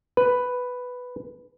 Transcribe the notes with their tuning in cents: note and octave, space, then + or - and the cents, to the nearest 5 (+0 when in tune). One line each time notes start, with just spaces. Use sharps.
B4 +5